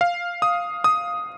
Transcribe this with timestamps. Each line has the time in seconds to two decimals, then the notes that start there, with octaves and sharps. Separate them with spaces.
0.01 F5
0.42 D#6
0.84 D#6